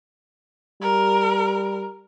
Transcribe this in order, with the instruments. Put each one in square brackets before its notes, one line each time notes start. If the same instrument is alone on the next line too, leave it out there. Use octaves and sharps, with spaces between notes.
[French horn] G3 [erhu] A#4